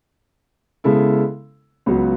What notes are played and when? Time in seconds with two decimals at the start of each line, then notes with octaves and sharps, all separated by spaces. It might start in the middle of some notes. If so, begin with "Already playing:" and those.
0.84 C#3 G#3 B3 E4 A4
1.86 C#2 C#3 F#3 B3 F#4